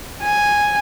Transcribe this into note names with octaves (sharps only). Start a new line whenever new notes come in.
G#5